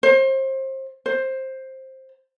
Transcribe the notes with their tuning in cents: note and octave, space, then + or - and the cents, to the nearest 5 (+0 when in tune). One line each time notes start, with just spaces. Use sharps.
C5 +30
C5 +10